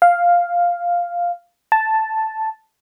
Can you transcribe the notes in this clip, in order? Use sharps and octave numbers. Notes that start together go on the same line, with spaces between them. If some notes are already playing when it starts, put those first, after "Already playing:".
F5
A5